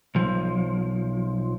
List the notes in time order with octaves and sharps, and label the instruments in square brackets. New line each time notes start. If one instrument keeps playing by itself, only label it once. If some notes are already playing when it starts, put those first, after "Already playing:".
[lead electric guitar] B1 F3